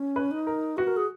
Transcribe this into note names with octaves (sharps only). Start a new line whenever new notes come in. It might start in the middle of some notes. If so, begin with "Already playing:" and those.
Already playing: C#4
B4
D#4
A#4
F#4 B4
A#4
G#4